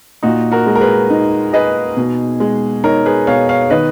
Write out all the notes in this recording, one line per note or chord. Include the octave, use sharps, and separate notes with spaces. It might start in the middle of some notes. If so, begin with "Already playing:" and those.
A#2 D#4 F#4
F#4 A#4
G#3
A#4
G#4 B4
D#4
G#4 B4 D#5
B2
G#3
D#4 A#4 C#5
G#4 B4
B2 C#5 F5
C#5 F5
D#3 B4 D#5